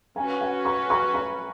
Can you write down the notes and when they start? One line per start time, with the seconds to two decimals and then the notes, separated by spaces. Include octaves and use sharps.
0.16 C#4 F#4 B4 G#5
0.41 F#5
0.65 C#6
0.90 C#6
1.14 B5